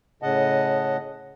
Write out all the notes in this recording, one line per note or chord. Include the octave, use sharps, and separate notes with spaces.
A2 C#3 D#5 F#5 A5